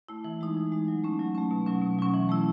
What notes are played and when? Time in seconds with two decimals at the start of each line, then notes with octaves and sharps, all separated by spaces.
0.09 A3 E4
0.25 E3
0.41 G#3 D#4
0.57 E3
0.72 G#3 D#4
0.88 F#3
1.04 A3 C#4
1.19 F#3
1.35 A3 C#4
1.51 B2
1.66 F#3 C#4
1.82 B2
1.99 F#3 C#4
2.14 E3
2.29 A3 E4